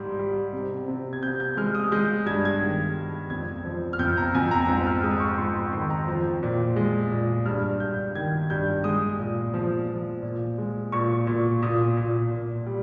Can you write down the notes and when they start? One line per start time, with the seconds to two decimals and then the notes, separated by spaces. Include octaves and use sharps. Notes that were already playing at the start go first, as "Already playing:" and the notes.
Already playing: G#2 G3
0.19 G3
0.53 C3
0.88 C3
1.13 G#6
1.23 C3 G6
1.40 G6
1.57 G#3 F6
1.75 D#6
1.92 G#3 G6
2.26 G2 G#6
2.45 G#6
2.61 D#3
2.96 G#3
3.30 F2 G#6
3.65 F3
3.93 F6
3.99 F2 G6
4.17 A#5
4.34 F2 G#5
4.51 A#5
4.68 G#2 A#5
4.87 F6
5.03 G#3 D#6
5.20 C#6
5.38 G#2 C6
5.55 C6
5.73 D#3 C6
5.90 A#5
6.08 F3
6.43 A#2
6.76 G#3
7.11 A#2
7.46 G2 F6
7.80 G2 G6
8.15 D#3 G#6
8.50 G2 G6
8.84 G#3 D#6
9.19 A#2
9.54 F3
9.88 F3
10.23 A#2
10.58 G#3
10.92 A#2 C#6
11.27 A#2
11.62 A#2 D#6
11.97 A#2
12.31 A#2
12.66 G3